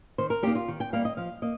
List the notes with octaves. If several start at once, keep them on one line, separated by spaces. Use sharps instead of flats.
D#3 C5
A#4
G3 A#3 D#4 G4
F4
D#3
G5
G3 A#3 D#4 F5
D#5
F3 F5
A#3 D#5